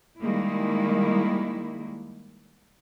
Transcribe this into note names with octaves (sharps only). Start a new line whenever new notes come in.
D#3 G3 G#3 A#3 E4